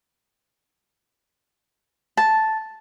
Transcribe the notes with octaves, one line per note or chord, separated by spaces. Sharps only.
A5